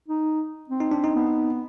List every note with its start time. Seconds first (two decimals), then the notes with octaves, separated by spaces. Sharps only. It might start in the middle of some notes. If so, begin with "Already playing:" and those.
0.08 D#4
0.69 C4
0.80 D#4
0.92 D4
1.04 D#4
1.16 B3